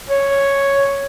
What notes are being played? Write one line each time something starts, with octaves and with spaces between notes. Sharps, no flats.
C#5